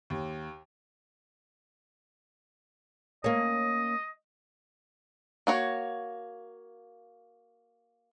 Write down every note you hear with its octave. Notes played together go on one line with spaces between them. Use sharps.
D#2
A#3 C#4 D#5
A#3 F#4 C#5